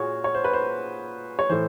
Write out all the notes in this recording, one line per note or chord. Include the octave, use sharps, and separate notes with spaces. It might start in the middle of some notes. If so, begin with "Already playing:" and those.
Already playing: A#2 F4 F#4 G#4 C#5
C#5
C5
B4
C5
C#5
A2 E3 C5